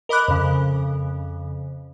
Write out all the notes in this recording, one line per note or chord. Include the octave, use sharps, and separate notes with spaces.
A#4 D#5 B5 D6 F#6
F2 C#3